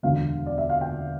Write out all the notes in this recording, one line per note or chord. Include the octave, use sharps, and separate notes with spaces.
E1 D2 D3 F5
D5
E5
F5
G5